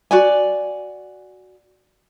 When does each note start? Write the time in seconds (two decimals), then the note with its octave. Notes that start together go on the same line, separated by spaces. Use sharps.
0.11 F#4 D5 G#5